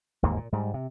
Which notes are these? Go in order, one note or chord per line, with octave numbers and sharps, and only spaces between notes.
G1 D#2 G#2 A#3
A#2
G#2 G3
C3